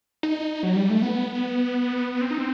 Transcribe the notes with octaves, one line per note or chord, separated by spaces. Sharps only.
D#4
F#3
G3
A3
B3
C4
D#4
C4